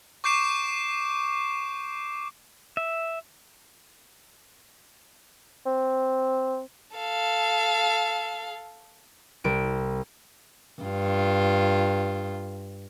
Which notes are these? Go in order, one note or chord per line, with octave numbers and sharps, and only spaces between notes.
C#6 D6 G6 C7 D7 E7
E5
C4
A4 F5
C2 D7
G2 F4